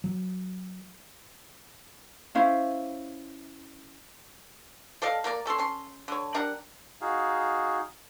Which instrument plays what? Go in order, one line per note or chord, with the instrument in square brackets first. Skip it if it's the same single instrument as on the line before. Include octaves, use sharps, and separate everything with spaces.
[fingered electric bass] F#3
[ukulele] C#4 E4 C5 F5
[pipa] A4 D5 D#5 F5
A#3 A#4 D5
C#4 A4 C#5 C6
C#4 C6
D3 C#5
G3 D4 A#4 F#5
[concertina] D#4 F#4 G#4 F5